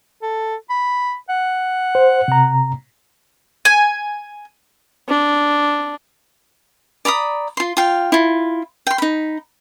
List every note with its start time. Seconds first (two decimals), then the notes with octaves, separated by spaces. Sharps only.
0.22 A4
0.70 B5
1.29 F#5
1.95 C5
2.28 C3 A#5
3.65 G#5
5.09 D4
7.05 D5 A#5 B5 D#6
7.57 F4 C6
7.77 F4 F5 G5
8.12 E4 F4
8.87 G5 C6
8.98 D#4 B5